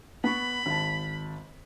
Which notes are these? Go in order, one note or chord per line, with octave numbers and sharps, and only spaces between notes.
B3 B5 C#6
G#1 A5